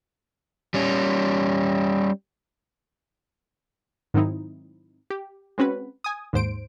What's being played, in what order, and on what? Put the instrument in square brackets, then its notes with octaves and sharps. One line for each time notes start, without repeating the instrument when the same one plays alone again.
[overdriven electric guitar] G3 C#4
[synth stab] G#2 D#3 F#3 C4 D#4 E4
G4
G#3 C4 C#4 F#4 B4
G#5 D#6
D#2 G#2 C5 D7